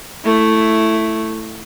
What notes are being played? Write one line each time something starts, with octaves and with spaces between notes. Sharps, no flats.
A3 E4